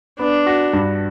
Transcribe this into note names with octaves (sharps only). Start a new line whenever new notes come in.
B3 D4
F#4
G2